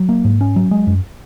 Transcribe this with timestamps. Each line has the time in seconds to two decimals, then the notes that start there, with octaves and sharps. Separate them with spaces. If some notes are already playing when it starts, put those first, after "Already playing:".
Already playing: F#3
0.09 A#3
0.25 G#2
0.41 C#4
0.56 F#3
0.71 G#3
0.87 F#2